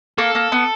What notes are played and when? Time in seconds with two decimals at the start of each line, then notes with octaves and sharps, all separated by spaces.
0.18 A#3 A4
0.35 A#3
0.52 B3